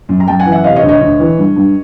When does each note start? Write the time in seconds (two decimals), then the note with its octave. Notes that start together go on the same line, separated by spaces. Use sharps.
0.09 F#2
0.20 A#5
0.28 F#2 G5 A5
0.40 F#5 G#5
0.46 E3
0.52 E5 F#5
0.64 C3 D#5 F5
0.76 C#5 D#5
0.83 D2
0.89 C#5 D#5
1.01 D2
1.20 E3
1.39 G2
1.56 G2